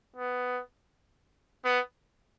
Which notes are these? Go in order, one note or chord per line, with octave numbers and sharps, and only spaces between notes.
B3
B3